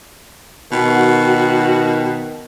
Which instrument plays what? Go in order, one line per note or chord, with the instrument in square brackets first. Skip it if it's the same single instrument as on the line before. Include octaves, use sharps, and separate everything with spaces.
[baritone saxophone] B2 [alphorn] D#3 [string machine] F#4